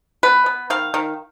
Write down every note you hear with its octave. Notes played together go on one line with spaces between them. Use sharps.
B3 B4
B3
D#3 F5
D#3